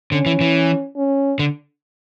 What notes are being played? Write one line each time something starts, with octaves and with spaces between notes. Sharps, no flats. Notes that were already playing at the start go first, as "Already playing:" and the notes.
D3 C#4
E3
E3
C#4
D3